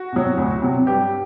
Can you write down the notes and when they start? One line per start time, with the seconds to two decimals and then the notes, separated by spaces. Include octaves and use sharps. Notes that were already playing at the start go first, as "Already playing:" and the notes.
Already playing: F#4
0.12 C3 F#3
0.37 D2
0.62 C3 F#3
0.87 G2 G4